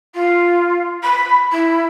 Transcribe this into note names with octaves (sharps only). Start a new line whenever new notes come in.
F4
B5
E4